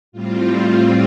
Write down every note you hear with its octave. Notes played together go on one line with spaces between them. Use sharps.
A2 G3 C4 F4